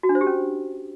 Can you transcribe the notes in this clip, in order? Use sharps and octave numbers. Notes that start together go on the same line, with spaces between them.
F#4
D4
C5
G4
C#4